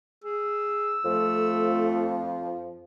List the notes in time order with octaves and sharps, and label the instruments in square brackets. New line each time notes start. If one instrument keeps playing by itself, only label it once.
[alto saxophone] G#4 [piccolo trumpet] E6
[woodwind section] F2 F3 [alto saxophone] A3